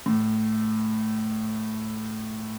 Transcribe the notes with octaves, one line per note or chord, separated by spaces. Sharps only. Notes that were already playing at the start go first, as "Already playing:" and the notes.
A2